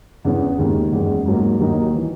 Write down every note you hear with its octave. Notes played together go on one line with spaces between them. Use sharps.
E2 C#3 E3 B3
D#2 D#3 G#3
F#1 E2 C#3 G#3
G#2 F#3 A#3
D#2 D#3 F#3 A#3 D#4
E3